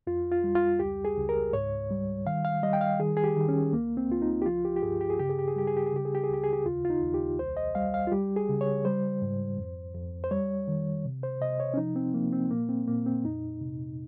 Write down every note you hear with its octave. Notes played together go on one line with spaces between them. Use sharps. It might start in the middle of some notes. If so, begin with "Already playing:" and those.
F2 F4
F4
G3
F4
C#2 G4
G#4
C#2
A#4
G#2 C#5
G3
D#3 F5
F5
G3 D#5
G5
F5
D#3 G#4
G#4
G4
D#3
C#4
C#2 A#3
C4
C#2 F4
D#4
G4
F3 F4
G4
G4
G2 G#4
G4
G#4
C#3 G4
G#4
G4
G#4
G3 G4
G#4
G4
G#4
C#3 G4
G#4
G4
G#4
C#2 G4
G#4
G4
D#2 F4
F4
D#4
D#2
G4
C2 C5
D#5
G3 F5
F5
F4
G3 G4
G#4
C#3
C#5
G3 C5
G#2
F2
F2
C5
G3 C#5
D#3
C3
C5
C3 D#5
C#5
C#4
F3 D#4
C4
F3 A#3
C4
A#2 A#3
C4
A#2 A#3
C4
F2 D#4
C3